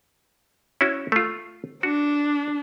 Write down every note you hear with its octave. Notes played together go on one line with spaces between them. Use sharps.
C#4 E4 F#4
A3 F4
D4 F#4